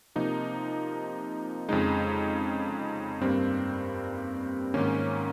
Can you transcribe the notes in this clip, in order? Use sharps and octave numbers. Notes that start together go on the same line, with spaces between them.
C3 F3 A#3 D#4
F2 C#3 G#3 D#4
G2 G3 A#3 C4
G#2 D#3 A#3 C#4